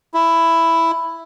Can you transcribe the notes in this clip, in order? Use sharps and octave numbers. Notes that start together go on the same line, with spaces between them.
E4